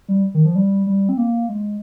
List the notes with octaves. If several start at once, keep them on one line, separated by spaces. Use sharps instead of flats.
G3
D#3
F3
G3
G3
C4
A#3
G#3